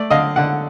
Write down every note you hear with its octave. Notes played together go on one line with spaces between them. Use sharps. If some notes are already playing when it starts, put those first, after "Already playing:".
Already playing: A3 D5
D3 D#5 F5
D3 F#5